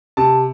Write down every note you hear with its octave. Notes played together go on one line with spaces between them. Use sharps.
C3 A5